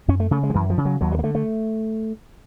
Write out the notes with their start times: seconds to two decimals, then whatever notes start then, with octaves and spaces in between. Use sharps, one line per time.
0.08 F#2 C#4
0.20 A3
0.31 C#3 A3
0.43 G#3
0.50 F3
0.54 F#2 E3
0.70 F3
0.77 C#3
0.85 F#3
1.01 D#2 F#3
1.12 G3
1.19 A#3
1.23 D3 A3
1.35 A3